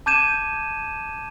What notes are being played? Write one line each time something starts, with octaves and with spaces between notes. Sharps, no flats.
A5 D6 G6 G#6 D#7 E7